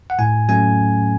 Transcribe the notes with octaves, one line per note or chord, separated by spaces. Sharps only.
F#5
A2 G#5
F#3 A3 C#4 G#5